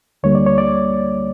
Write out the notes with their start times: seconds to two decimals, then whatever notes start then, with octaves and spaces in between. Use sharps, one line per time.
0.23 D2 D3 G3 A#3 C#5
0.35 D5
0.46 C#5
0.58 D5